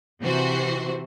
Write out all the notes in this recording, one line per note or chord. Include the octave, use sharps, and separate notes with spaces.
C3 E3 F#4 C5